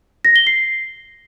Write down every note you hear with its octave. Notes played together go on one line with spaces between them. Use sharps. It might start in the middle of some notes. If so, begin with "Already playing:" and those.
A#6
G7
C7